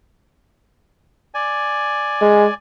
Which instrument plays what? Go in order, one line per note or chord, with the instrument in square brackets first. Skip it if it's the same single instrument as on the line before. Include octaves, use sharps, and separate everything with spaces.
[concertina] D5 G#5
[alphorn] G#3